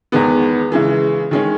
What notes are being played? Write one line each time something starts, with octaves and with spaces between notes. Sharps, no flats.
E2 D#3 G#3 B3
C#3 E3 G#3
D#3 G#3 C#4